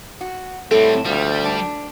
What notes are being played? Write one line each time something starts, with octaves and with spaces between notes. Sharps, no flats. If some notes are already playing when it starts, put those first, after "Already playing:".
F#4
A2 G3 A3 C4 A4
D2 F3 G3
D4